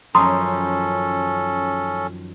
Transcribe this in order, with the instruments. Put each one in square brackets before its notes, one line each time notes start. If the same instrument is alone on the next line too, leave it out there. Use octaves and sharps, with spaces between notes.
[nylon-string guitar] F#2 D#3 F3 [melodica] C#4 A4 [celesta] A#5 C6 D#6